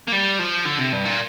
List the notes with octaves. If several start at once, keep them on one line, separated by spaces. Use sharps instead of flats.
A#3
G3
F3
D3
C3
G2
A#2